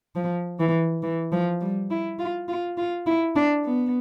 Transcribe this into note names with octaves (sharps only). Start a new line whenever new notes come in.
F3
E3
E3
F3
G3
E4
F4
F4
F4
E4
D4
B3